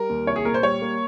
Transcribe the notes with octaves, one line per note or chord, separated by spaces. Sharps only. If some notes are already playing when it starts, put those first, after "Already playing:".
Already playing: G3 A#4
D#2
C2 C#5
G#4
A#2 A#4
C5
G3 C#5
A#3